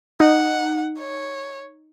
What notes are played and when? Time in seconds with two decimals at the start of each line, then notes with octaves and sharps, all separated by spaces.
0.20 D#4 F#5
0.98 C#5